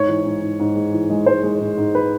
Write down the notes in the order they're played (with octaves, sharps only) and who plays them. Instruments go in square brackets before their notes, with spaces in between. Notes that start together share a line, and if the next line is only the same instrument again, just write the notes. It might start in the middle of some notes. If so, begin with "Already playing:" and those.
Already playing: [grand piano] G#2 C#5
E3
G#2
G#2
G#2
G#3
E3
G#3
G#3 C5
G#3
G#2
G#2
B4